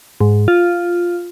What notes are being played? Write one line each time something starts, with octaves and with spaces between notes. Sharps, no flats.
G#2
F4